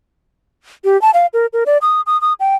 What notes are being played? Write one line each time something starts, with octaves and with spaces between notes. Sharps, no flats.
G4
A5
F5
A#4
A#4
D5
D#6
D#6
D#6
G5